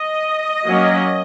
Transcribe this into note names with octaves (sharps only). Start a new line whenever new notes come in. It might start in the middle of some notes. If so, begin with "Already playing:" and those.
Already playing: D#5
F#3 A#3 C#4